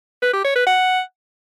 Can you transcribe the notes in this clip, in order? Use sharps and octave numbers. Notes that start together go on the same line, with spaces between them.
B4
G4
C#5
B4
F#5